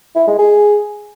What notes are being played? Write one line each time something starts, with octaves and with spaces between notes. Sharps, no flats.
E4
G#3
G#4